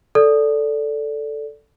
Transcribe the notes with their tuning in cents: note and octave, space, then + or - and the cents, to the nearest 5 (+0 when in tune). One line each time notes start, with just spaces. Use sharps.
A4 +0 D5 -10